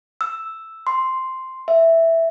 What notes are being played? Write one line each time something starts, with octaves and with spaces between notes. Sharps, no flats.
E6
C6
E5